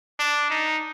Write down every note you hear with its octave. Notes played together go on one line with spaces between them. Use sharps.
D4
D#4